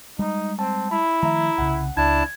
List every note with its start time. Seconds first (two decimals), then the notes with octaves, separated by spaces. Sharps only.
0.19 G3 G#3 D#4
0.59 C4 A5
0.91 E4 B5
1.23 D#3 F3 A3 E5 A#5
1.58 C2 C#3 F#5
1.97 C#2 D4 E4 A5 G#6